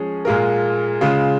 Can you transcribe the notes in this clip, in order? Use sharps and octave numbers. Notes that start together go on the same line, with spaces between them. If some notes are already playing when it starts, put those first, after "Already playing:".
Already playing: F3 G#3 C#4 G#4
A#2 G#3 F4 A#4
C#3 G#3 F4